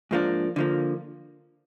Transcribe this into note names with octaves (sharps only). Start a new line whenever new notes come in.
G#2 F3 A#3 D4
D3 F3 A#3